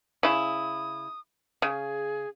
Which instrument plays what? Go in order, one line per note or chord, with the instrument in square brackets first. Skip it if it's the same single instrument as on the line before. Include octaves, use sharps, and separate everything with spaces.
[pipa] C#3 E4 [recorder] D#6
[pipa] C#3 [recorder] G#4